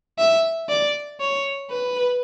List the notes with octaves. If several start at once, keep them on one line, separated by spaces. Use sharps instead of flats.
E5
D5
C#5
B4